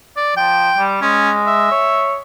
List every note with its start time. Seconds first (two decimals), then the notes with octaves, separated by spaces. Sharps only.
0.17 D5
0.37 F3 G5
0.78 G3
1.02 G#3 C#4
1.47 E5
1.71 C#5